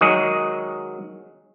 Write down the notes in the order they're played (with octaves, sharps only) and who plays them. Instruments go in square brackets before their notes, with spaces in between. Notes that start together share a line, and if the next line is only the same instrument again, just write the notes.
[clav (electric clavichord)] D#3 F#3 G#3 D#4 G#4